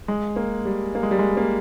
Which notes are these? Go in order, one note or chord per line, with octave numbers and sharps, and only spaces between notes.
G#3
A#3
G3
A#3
G#3
G3
G#3
A#3